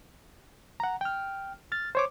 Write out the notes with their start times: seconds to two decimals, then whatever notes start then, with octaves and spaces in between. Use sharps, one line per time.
0.80 F#5 A#5
1.01 G5 F6
1.72 F6 A6
1.95 C5 C#5 D6